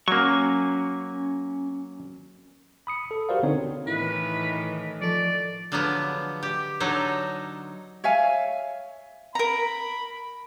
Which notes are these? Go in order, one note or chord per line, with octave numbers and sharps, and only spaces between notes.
F#3 A#3 C#4 C#6
B5 D#6 C#7
A4
F#4 G4 A#4 C5 D5 F5
D3 B3 C4 D4 D#4 C#5
A2 D#3 E3 E4 B4
F3 A4 D5 C#6
D3 F3 F#3 G#3 B3
G4
D3 F#3 D#4 A4
C#5 E5 F5 G#5
A#4 A#5 B5